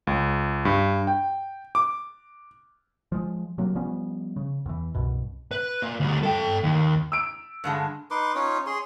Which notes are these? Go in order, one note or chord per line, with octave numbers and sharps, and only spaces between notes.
C#2
G2
G5
D6
F3 G#3
C3 F#3 A#3
F3 G3 B3 C#4
C#3
E2 E3
C2 F#2 B2
B4
A#2
D2 G3
A4 G5
D#2
E6 D7
G2 D3 G#3
D#4 B4 C6 D6
C#4 D#4 F4 C#5
G#4 C#5 C6